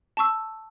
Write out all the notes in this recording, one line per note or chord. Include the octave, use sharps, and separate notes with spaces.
A5 C#6 E6